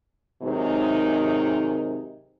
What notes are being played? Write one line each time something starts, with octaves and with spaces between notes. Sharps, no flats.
G#2 C3 D#3 F#3 G#3 D#4